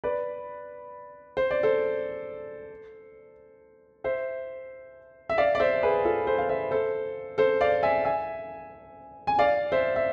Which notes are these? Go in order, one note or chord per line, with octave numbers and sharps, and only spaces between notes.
B4 D5
C5
D5
A4 C5
C5 E5
E5
D5 F5
D5
C5 E5
G#4 B4
F4 A4
A4 C5
F5
C5 E5
A4 C5
A4 C5
D5 F5
E5 G#5
E5 G#5
G#5
D5 F5
C5 E5
E5